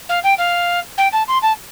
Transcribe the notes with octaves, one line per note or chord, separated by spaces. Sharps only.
F5
G5
F5
G5
A5
C6
A5